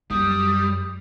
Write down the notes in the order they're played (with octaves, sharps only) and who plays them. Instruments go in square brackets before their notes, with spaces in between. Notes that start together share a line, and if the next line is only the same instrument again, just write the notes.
[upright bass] F#2 [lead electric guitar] G3 [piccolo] D#6